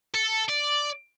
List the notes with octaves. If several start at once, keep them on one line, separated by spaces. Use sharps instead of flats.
A4
D5